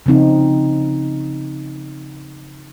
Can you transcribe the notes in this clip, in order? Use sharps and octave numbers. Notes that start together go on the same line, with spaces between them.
C#3 F3 C4 D#4